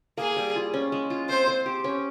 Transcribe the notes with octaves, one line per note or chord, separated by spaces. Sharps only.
A#3 G#4
G3
F4
C#4
G#3
F4
C4 C5
C5
G4
C#4